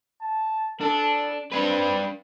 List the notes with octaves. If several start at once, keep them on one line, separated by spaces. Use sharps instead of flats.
A5
D4 A4
C4 D4 B4